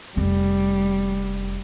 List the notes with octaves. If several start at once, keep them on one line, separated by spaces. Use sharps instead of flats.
F1 G3 C#4